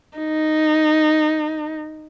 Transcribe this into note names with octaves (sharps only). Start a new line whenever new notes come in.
D#4